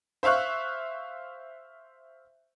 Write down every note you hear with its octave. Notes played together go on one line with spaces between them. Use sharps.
C5 E5 F5 C#6 F#6